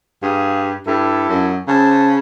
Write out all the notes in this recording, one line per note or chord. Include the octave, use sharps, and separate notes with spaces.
G2 G#4 F5
G2 E4 A4
F#2
C#3 C5 A5